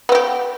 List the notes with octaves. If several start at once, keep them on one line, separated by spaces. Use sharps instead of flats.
B3 C4 G4